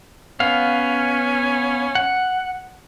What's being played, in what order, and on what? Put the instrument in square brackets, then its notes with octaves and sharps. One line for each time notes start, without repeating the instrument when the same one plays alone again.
[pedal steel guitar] B3 F5 [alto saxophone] C#4
[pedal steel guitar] F#5